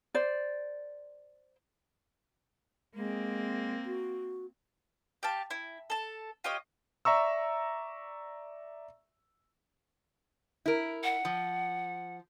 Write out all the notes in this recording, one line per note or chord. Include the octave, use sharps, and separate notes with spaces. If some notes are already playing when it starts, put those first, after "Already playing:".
C5 D5
G#3 A#3 C4
F#4
G4 F5 A5
E4
A4 A5
F4 G4 C#5 D#5
D5 E5 A#5 C#6 E6
E4 A#4
F#5
F3